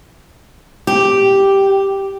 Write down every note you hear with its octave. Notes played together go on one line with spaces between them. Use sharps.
G4